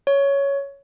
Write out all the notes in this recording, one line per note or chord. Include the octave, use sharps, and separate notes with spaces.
C#5